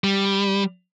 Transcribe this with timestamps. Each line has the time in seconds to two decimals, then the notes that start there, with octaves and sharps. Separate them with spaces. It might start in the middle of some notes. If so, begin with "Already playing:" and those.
0.04 G3